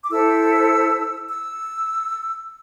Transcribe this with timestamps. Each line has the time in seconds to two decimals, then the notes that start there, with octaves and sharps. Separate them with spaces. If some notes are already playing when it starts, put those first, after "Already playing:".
0.04 D6
0.10 E4 A4 C5 E6
1.28 E6